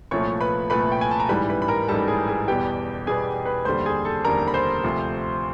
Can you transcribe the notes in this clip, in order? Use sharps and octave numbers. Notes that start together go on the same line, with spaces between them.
C2 A#2 F3 A3 C#5 C#6
B4 B5
C2 A#2 F3 A3 B4 B5
G5
G#5
A5
A#5
A1 G#2 E3 G3 B4 B5
B4 B5
B5
A#4 A#5
A1 G#2 E3 G3 A4 A5
G#4 G#5
G#4 G#5
E2 B2 G3 B3 G4 G5
E2 B2 G3 B3 G#4 G#5
B4 B5
F1 D#2 D3 G3 C5 C6
G#4 G#5
A4 A5
F1 D#2 D3 G3 A#4 A#5
B5
C5 C6
D2 C3 F3